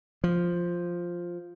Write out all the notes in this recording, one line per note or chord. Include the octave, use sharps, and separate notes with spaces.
F3